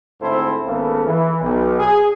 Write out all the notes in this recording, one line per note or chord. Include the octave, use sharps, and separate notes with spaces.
D2 G#2 C4 E4 A4 C5
G#1 C#3 A#3 B3 A4
E3
B1
G#4